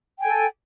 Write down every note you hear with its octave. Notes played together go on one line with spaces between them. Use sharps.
A4 G5 G#5